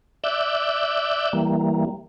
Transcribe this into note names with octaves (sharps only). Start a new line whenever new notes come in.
D5 E5 D6 E6 F#6 G6
E3 G3 A#3